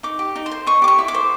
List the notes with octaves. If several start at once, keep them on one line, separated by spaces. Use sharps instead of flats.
D#4 D6
G4
D#4
C6
C5
D#5 C#6
G4 D6
C#6
E4
D6
C5